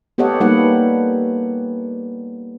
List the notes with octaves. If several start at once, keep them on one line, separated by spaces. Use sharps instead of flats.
B3 G4 A4 C#5 D#5 F#5
G3 A#3 D#4 B4 F#5